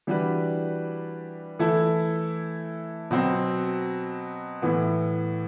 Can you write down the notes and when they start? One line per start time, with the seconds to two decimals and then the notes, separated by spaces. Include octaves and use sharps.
0.07 E3 G3 D4 F#4 B4
1.59 E3 A3 E4 A4
3.11 B2 F#3 C4
4.62 A2 E3 B3